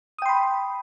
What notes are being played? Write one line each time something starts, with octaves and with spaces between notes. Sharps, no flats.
G5 B5 C6 D#6